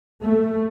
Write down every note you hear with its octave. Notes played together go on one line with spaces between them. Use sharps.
A3